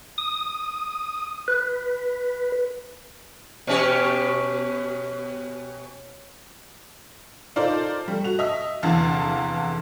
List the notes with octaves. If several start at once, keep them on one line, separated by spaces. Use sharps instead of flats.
D#6
B4
B2 C#4 G4
D#4 F4 A4 A#4 C5 D5
G3 A3
F#4 F7
D#5 E5
F1 E2 D3 E3 F5 A5